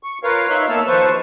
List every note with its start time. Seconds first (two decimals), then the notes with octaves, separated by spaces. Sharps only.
0.03 C#6
0.23 F4 A#4 B4 C#5 F5
0.50 D#4 C#5 E5 C6 F#6
0.69 A#3 B3 A4 A5 E6 F6
0.87 D#2 F3 B4 C5 A5 C#6